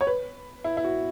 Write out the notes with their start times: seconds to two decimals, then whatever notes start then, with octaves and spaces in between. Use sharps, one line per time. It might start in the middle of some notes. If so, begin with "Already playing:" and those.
0.01 C#5
0.07 B4
0.64 E4
0.77 E4
0.84 F#4